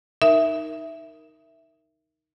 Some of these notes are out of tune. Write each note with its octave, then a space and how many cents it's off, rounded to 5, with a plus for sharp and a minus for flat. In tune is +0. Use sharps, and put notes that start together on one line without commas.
D#4 +0 A#4 +0 E5 +0